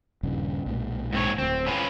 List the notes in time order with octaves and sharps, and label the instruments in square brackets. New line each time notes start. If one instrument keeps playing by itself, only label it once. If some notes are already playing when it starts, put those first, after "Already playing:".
[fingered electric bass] D#1 G2 C#3
B1 A#2 G#3
[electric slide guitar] G#2 C4 C#5
[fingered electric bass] D1 D2 [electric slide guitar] C4
[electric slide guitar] C#4 F4 B4